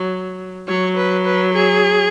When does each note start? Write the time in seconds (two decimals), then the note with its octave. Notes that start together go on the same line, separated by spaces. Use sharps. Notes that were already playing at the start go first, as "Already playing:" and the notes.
Already playing: F#3
0.68 F#3 C#5
0.96 B4
1.26 B4
1.54 G#4